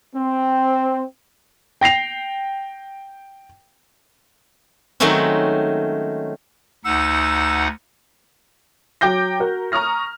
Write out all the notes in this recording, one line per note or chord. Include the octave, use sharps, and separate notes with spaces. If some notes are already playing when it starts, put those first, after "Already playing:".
C4
G5 A#6 C7 F7
D#3 F#3 G#3 A3 C4 C#4
D2 D#4 F#5 E6
F#3 G5 D6 G6 A#6
F#4 A#4
A#5 C#6 D#6 F6 A#6